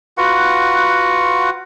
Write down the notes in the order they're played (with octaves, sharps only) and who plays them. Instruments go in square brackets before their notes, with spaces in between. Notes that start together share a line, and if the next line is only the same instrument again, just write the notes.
[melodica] F4 F#4 B4 F#5